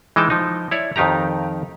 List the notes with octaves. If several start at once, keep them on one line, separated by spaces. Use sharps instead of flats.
E3 G#3 D#4 G5 A5
F3 D#4
E4 C#5 D5
F2 D#3 D#4 G4 A#5